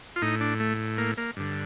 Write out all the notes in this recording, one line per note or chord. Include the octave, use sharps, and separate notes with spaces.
F4
A2 D#4
D4
A3
A#3
A#3
G2 D3